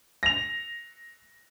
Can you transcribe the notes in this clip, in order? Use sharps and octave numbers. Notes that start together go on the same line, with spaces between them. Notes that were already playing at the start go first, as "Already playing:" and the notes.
A#6 F7